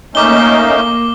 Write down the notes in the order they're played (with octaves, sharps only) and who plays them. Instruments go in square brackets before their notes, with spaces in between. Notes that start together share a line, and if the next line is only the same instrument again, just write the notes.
[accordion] A3 C#4 D#4 [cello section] A#3 [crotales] D6 G7